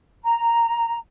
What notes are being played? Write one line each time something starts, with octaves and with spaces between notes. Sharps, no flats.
A#5